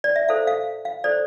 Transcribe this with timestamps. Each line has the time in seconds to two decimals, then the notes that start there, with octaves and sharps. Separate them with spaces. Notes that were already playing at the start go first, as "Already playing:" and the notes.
0.04 D5
0.16 E5
0.28 E4 A4 C5 F5
0.47 F5
0.85 F5
1.04 E4 A4 C5 D5